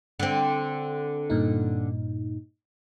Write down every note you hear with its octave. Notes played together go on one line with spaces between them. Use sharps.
D3 C4
G2 A#2 D#4